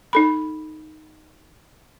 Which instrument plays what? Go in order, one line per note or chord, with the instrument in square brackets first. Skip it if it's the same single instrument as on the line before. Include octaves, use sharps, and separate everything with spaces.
[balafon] D#4 A4 B5